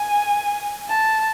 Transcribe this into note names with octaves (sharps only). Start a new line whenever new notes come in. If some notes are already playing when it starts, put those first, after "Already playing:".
Already playing: G#5
A5